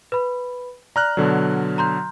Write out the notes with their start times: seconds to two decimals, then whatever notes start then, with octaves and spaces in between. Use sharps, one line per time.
0.12 B4 B5
0.96 D5 A#5 F6 F#6
1.17 B2 D3 F#3
1.78 A#5 C6 G6